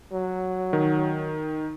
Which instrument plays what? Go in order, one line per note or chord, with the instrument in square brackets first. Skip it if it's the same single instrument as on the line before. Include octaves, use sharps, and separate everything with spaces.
[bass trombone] F#3
[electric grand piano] D#3